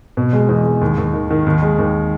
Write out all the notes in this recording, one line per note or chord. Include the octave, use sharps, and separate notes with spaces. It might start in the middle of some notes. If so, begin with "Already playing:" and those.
B2
G#3
E2
G#3
D#2
D#2
D#3
D#3
D#2
G#3
D#2